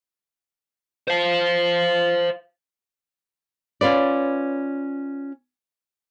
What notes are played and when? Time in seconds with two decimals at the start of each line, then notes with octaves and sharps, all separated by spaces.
1.08 C5 F5
3.81 C#4 F4 B4 D5